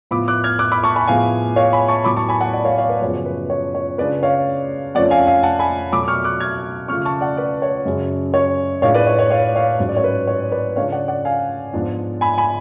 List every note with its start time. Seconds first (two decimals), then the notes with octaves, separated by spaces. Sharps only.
0.11 A2 F3 B3 F4 B5 D6
0.28 D6 F#6
0.44 F6 G#6
0.59 D6 F#6
0.72 B5 D6
0.84 A5 C#6
0.95 G#5 B5
1.08 A2 F3 G#3 B3 F4 F5 G#5
1.56 C#5 F5
1.73 G#5 B5
1.88 A5 C#6
2.04 A2 F#3 B3 B5 D6
2.16 A5 C#6
2.29 G#5 B5
2.41 F#5 A5
2.53 D5 F#5
2.65 C#5 F5
2.77 C#5 F5
2.89 B4 D5
3.01 F#2 C#3 F3 G#3 B3 C#5
3.26 B4
3.50 C#5
3.75 C#5
3.98 C#3 G#3 D4 F4 B4 D5
4.23 C#5 F5
4.95 F2 F3 A3 C#4 D5 F#5
5.11 F5 G#5
5.27 F5 G#5
5.43 F#5 A5
5.59 G#5 B5
5.92 B2 F#3 A3 B5 D6
6.03 D6
6.08 C#6 F6
6.24 D6 F#6
6.40 F6 G#6
6.88 C#3 F3 A3 F4 C#6 F6
7.05 A5 C#6
7.21 D5 F#5
7.37 B4 D5
7.62 C#5
7.85 F#2 C#3 G#3 C#4
8.34 C#5
8.82 A2 G#3 D4 F4 C#5 F5
8.94 B4 D5
9.07 C#5
9.19 C#5
9.30 C#5 F5
9.56 C#5 F5
9.79 G#2 F#3 C#4
9.89 D5
9.97 C#5
10.04 B4
10.27 C#5
10.52 B4 D5
10.76 C#3 G#3 D4 F4 C#5 F5
10.92 D5 F#5
11.08 D5 F#5
11.25 F5 G#5
11.74 G#2 F3 B3 D4
12.21 G#5 B5
12.38 G#5 B5